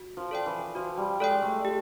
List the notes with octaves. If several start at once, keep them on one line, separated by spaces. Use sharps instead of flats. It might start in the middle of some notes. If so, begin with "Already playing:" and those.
Already playing: F#4
F3
A4 D5 G5
E3
F3 F#4
G3
G#3 A4 D5 G5
A3
G4